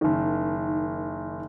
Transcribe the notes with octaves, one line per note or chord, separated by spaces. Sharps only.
F#1 D#3